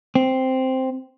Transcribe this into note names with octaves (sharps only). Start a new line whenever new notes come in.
C4